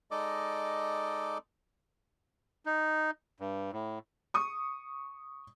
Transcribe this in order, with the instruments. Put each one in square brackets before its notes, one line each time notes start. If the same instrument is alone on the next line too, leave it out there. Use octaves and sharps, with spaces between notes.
[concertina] G#3 D#4 A4 D5 D#5 D6
[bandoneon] D#4
G2
A2
[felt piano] C#6 D#6